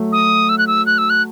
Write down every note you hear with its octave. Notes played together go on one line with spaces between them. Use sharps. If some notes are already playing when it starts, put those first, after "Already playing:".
Already playing: F#3 A3
D#6
E6
F#6
E6
F#6
E6
F#6